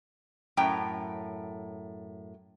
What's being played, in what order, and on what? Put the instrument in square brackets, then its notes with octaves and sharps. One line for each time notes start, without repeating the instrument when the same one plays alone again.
[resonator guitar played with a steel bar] F#2 A2 G5